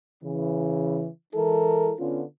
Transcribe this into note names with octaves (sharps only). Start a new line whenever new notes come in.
C#3 E3
E3 G#3 E4 A4 A#4
D3 B3 C#4 F4